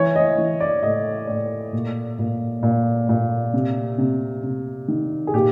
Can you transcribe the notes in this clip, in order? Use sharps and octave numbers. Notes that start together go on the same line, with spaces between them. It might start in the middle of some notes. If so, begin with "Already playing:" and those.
Already playing: E3 C#5
D#5
E3
D5
A2 D#5
A2 D5
A#2
A#2
A#2
A#2
C3
C3
C3
D#3
G#4
A#2 G4